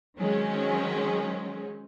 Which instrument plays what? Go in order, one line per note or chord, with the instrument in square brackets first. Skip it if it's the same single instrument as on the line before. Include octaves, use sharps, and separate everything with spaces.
[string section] D#3 F#3 G#3 C4 C#4